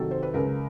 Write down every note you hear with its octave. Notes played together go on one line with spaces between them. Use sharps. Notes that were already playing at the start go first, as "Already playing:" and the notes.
Already playing: C3 D#3 F#3 A4
C5
B4
C#2 A#4